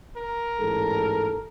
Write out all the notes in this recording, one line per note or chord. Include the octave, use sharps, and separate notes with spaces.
A#4
A1 G#2 A4